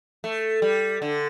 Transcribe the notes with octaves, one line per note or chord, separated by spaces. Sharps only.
A3
G3
D3